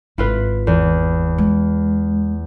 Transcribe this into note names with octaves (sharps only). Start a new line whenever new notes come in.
G#1 E4 F4 B4
E2
G#3